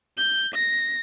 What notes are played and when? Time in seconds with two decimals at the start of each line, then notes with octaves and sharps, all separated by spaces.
0.17 G6
0.54 A#6